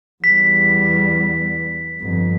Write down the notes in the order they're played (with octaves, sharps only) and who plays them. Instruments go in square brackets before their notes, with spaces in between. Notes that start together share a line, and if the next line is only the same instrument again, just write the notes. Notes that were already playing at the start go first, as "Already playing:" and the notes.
[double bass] E2 G3 [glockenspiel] B6
[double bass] G1 F2